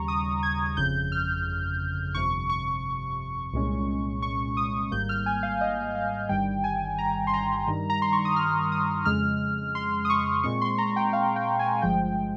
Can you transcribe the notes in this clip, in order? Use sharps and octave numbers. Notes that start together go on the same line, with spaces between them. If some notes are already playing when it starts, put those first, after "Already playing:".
Already playing: D#2 C#3 G3 A#5 C#6
D#6
G#6
G1 F2 C#3 G6
F6
G1 F2 C3 C#6
C#6
C2 A#2 G#3 C#4
C#6
D#6
G#1 G#2 G3 A#3 G6
F6
G#5
F5
D#5
F5
G1 G2 D#3 G3 G5
G#5
A#5
C6
A#5
G2 D#3 G3
A#5
C6
C#6
D#6
F6
D#6
F2 C#3 G#3 F6
C6
D#6
C#6
A#2 G#3 C4 C#6
C6
A#5
G5
F5
G5
G#5
G1 G2 F3 G#3 G5